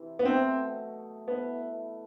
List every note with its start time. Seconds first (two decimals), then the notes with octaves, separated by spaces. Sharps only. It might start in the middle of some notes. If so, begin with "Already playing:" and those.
Already playing: C3 E3
0.19 B3
0.25 B2 F#3 A3 C4 D#4
1.28 B2 A3 B3 E4 B4